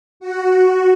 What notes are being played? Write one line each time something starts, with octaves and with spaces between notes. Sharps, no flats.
F#4